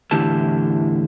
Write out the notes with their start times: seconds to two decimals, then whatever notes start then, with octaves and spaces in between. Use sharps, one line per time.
0.11 E2 A2 D3 E4 G4 A5